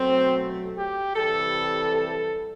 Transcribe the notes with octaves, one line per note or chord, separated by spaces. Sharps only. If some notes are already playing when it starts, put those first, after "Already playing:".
Already playing: B2 F#3 A3 C4
G4
C3 E3 G3 A4
A4